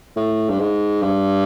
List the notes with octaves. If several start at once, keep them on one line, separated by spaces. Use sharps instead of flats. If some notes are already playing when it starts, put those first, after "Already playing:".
A2
G2
G#2
G2